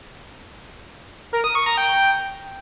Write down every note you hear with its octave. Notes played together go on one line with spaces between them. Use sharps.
A#4
D#6
C#6
A#5
G5